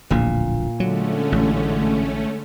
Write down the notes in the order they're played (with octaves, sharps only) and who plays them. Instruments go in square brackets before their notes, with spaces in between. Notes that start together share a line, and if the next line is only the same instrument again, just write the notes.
[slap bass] D1 A#1 E2 [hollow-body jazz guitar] A#2
[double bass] D3 G#3 [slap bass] F#3 [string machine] A3 C#4
[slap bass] A1